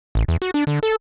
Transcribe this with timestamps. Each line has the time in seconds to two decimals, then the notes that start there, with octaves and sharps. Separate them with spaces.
0.15 A1
0.28 E2
0.42 F#4
0.54 D4
0.67 D3
0.83 A4